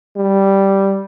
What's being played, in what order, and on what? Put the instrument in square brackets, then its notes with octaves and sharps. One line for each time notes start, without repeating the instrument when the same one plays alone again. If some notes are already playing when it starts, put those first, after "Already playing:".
[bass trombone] G3